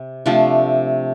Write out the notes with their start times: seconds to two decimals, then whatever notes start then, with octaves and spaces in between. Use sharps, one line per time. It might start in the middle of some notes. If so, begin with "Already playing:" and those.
Already playing: C3
0.26 C3 F3 A3 D4